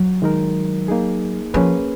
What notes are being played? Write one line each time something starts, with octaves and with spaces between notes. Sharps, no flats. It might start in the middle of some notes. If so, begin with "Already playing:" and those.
Already playing: F#3
D#3 G#3 D#4 A#4
A#3 D#4 G#4
F3 A#3 C#4 G#4 B4